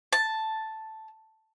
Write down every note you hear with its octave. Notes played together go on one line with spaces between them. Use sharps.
A5